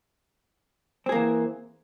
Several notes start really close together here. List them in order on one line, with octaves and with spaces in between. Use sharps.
C4 G#4 A#3 E3